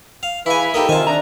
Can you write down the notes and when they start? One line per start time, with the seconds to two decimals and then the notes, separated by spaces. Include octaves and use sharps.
0.23 F5
0.46 E3 E4 G#4 B4 F5 G#5 B5
0.74 A#3 D#4 G4 A4 D#5
0.89 C3 D#3 F4 D#5 G#5 A5
1.07 D4 E5 A#5